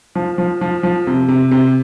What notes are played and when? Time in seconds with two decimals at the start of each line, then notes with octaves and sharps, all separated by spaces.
0.15 F3
0.38 F3
0.61 F3
0.83 F3
1.07 C3
1.28 C3
1.51 C3